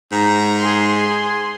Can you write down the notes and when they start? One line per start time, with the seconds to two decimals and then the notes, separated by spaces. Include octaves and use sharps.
0.12 G#2 A#5
0.58 G#4 C6